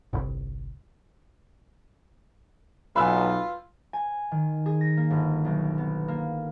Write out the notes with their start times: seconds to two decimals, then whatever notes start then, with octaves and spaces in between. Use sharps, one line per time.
0.13 G1 C2
2.96 B1 F4 B4 G#5 B5 E6
3.93 G#5
4.31 D#3
4.66 G#4
4.81 A#6
4.97 A#3
5.10 G1
5.45 B1
5.78 B3
6.08 A#3